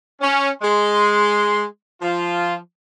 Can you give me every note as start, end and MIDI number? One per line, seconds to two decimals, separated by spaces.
0.21 0.49 61
0.62 1.64 56
0.62 1.64 84
2.02 2.55 53
2.02 2.55 65